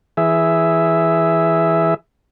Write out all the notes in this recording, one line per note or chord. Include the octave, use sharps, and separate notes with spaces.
E3 G#4 E5